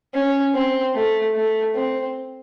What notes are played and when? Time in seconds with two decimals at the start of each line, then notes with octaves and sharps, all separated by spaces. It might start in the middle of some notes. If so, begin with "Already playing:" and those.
0.14 C#4
0.54 C4
0.95 A3
1.35 A3
1.76 C4